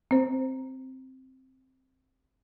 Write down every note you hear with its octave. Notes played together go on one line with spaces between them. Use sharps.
C4 C5